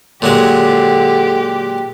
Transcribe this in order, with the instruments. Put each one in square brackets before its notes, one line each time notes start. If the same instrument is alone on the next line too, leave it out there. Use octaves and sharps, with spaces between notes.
[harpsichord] A#2 F#3 G#3 [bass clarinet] D3 [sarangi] G4